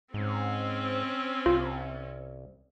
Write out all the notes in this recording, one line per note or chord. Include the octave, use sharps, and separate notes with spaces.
G#2 C4 C#4
C2 F4